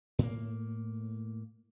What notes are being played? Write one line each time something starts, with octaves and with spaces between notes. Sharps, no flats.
A2 A#3